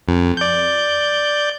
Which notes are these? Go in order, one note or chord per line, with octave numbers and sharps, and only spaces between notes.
F2
D5 G6